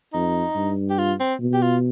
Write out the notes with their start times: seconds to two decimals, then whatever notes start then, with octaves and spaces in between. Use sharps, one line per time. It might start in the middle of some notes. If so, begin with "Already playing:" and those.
0.13 F2 D#4
0.55 G2
0.90 G4
0.98 F4
1.20 C4
1.40 B2
1.54 G4
1.62 F4